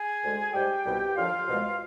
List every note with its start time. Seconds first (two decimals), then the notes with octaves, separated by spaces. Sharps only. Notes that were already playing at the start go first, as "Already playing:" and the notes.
Already playing: G#4 G#5
0.22 D2 D3 G#3
0.53 G#2 G3 G4 G5
0.84 C2 B2 G3
1.16 D#2 D3 F3 F4 F5
1.47 C2 B2 G#3